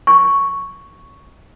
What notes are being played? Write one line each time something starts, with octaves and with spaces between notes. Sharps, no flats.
C#6